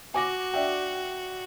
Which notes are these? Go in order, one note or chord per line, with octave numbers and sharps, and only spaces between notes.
F#4 G#5 D6 A#6
D4 E5 G5